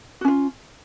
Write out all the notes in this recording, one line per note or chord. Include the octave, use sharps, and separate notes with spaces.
C#4 F4 F#4